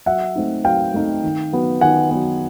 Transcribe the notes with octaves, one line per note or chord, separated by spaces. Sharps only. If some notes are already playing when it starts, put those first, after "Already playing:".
F#3 E5 F#5
A3 C4 D#4
F#3 F5 G5
A3 C4 D#4
D#3
F#3 B3
D#3 F#5 G#5
F#3 B3